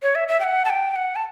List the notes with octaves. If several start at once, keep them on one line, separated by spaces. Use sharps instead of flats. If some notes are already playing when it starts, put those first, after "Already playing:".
C#5
E5
E5
G5
F#5
A5
G5
G5
F#5
A5